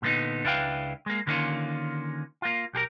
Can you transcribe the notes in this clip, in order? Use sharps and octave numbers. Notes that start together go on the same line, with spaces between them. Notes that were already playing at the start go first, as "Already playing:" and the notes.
A#2 D3 A3 B3 D#4
C#2 D4 E4 B4 F5 G5
G#3 A#3
D3 D#3 A#3 C4 C#4 F4
A#3 F4
B1 G4 G#4 A#4